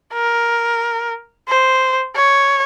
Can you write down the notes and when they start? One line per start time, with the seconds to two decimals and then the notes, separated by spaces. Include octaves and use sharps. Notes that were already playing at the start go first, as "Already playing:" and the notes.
0.14 A#4
1.48 C5
2.16 C#5